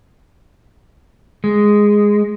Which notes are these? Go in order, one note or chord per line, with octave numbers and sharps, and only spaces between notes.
G#3